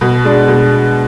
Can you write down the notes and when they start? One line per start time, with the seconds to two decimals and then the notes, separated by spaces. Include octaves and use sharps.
0.01 B2
0.25 G#3 D4
0.48 B2